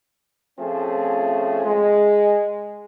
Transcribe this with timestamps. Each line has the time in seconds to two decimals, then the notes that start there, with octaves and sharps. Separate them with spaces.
0.60 F3 A3 C4 C#4 F4 G#4
1.65 G#3